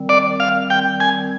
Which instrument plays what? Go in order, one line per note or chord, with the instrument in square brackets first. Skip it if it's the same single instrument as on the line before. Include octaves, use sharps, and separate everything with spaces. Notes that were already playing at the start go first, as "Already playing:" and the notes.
Already playing: [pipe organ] D#3 G3 C4
[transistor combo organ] D5
F5
G5
G#5